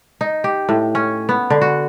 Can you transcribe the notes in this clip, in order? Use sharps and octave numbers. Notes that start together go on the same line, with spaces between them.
D#4
G4
A2
C#4
B3
D3
F#4